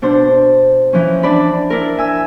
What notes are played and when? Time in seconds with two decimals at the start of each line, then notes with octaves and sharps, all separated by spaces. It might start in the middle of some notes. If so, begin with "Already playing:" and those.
0.02 B2 D4 C5
0.93 E3 F3 C#4
1.23 D4 D5 A5 B5
1.70 D4 E4 A#4
1.97 E5 G#5 E6